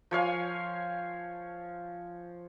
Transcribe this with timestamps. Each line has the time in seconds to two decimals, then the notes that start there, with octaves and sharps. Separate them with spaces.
0.11 F3 C#5 F5 G#5